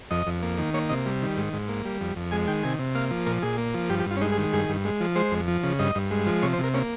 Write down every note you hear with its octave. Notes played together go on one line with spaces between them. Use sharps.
F2 D#5
F2
A#3
D#3
A#3 C#5
C3 D#5
G3
D#3
G#2
G#2
A#3
G3
F2
F2
G#3 G#5
D#3 G5
C3 G#5
C3
A#3 F5
F3
A#2 A#4
A#2 G#4
A#3
F3
G2 G4
G4
G2 F4
C#4
G#3 D#4
G#4
D#3
G2 G#4
G2
G#3
F3
G#3 C5
F2
F3
C#3
G2 D#5
G2
G#3
F3
C3 C#5
C5
C3
A#4
A#3 C#4